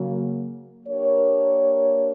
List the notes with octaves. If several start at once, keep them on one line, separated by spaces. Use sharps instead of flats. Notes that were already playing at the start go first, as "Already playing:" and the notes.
Already playing: C#3 F#3 A#3
A#3 D4 G4 A#4 C#5